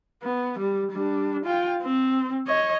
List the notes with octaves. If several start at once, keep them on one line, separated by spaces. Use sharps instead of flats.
B3
G3
G3 D4
F4 G5
C4
C#5 D#5